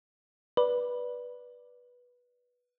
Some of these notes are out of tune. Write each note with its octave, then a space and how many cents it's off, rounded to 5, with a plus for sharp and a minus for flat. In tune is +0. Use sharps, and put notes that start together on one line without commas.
B4 -10 D5 +0